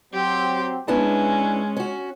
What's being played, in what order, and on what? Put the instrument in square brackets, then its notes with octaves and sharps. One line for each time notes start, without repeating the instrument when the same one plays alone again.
[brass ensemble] F#3 C4 [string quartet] G4 C6
[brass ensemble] G#3 [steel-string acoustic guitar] B3 D4 E4 [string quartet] C#4
[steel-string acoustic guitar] C#4 F#4